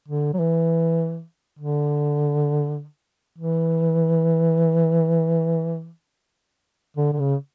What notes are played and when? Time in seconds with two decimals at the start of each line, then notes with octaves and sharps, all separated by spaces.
0.08 D3
0.33 F#3
0.39 E3
1.59 D3
3.38 E3
6.97 D3
7.13 D3
7.19 C#3